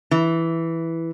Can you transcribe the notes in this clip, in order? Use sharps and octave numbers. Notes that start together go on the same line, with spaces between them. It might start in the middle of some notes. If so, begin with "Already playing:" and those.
E3